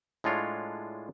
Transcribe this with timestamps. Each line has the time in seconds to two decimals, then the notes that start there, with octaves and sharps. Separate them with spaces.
0.24 A2 G#3 D4 F4 C#5